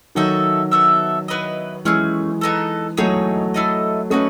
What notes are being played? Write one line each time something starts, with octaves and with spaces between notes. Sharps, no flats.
D#3 F#3 D#4 F#4 A4 E5
B3 F#4 A4 E5
B3 E4 B4 D#5
E3 G#3 A3 C#4 G#4
B3 D#4 A4
F#3 A3 D#4 G#4 C#5
E4 A4 D#5
A3 C#4 D#4 F#4 B4